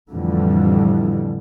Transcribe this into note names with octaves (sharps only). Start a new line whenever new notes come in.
F2 A2 D3 E3 F3 G3